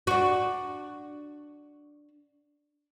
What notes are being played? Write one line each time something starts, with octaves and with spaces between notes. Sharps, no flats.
D4 F#4